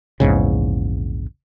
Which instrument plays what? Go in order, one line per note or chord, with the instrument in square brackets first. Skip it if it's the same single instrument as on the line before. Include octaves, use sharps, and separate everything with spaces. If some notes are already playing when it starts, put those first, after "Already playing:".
[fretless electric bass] A#1 E2 G#2 C#3